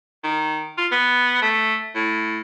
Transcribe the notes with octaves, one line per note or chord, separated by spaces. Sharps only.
D#3
F4
B3
A3
A2